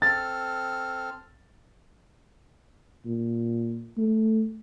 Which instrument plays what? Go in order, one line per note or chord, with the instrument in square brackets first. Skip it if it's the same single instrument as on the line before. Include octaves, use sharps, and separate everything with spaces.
[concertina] C4 A4 F6 [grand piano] A6
[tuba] A#2
A3